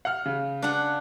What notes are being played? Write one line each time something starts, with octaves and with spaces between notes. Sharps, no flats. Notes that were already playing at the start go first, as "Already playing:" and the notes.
F#5 F6
C#3
D4 F#5